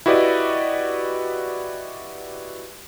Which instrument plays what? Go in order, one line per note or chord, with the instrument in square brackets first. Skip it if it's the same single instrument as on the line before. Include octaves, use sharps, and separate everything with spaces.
[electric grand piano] E4 F#4 G4 B4 D5 D#5